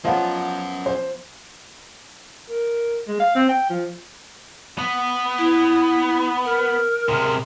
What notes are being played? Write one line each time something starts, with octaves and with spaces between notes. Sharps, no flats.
F3 B3 C#4 F4 C#5 D#5 F#5
C5
A#4
G#3
F5
C4
G5
F3
B3
E4
A#4
C3 G#3